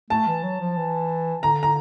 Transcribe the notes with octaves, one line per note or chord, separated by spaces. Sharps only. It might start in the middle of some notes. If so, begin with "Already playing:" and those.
A3 A5
E3
F#3
F3
E3
D3 A#5
A#5